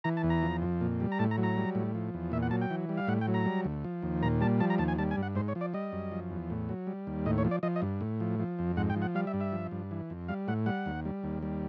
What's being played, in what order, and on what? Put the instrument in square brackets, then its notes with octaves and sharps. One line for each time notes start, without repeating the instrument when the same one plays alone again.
[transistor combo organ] E3 A#5
A5
E2
A#5
F3
F2
A#2
G3
A#5
A2 A5
A#5
F#3
A#5
G3
A2
F3
E2
A#2 E5
F#5
F#3 A5
G5
E3
G3
F5
A2 F#5
G5
F#3
A#5
G3
D2
F3
D#2
A#2 A#5
G3 A5
F3 A5
A#5
D#2 A5
G#5
G3 A5
G#5
G2
F#5
G#2 C5
C#5
F3
D5
G3 D#5
F#2
F3
E2
A2
F#3
G3
D#2
A2 D#5
C#5
F3
D5
F3 D#5
D#5
G2
A2
F3
F3
F2
G#2 F#5
G5
F3
F#5
G3 F5
E5
G2
E5
F3
G2
E3
F2
G3 F5
A2 F#5
G3 F#5
D#2
G3
D#2
G3